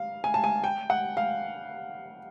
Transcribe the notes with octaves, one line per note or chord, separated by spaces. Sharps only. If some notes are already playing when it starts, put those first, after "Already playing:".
Already playing: F5
G#5
A5
G#5
G5
F#5
F5